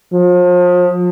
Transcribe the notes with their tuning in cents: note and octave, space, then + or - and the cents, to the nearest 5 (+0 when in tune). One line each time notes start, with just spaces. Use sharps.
F3 +35